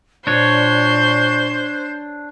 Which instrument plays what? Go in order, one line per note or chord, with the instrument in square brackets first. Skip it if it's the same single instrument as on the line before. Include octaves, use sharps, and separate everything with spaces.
[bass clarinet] A#2 [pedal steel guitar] D4 C#5 [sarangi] C5 [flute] C#6